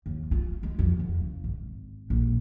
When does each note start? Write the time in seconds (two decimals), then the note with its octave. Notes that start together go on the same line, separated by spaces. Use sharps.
0.06 D#2
0.31 F4
0.63 G#3
0.79 F2
0.99 E2
1.21 C#3
1.44 G#1
2.10 A#1